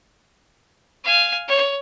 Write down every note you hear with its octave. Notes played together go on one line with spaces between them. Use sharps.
F5 G#5
C#5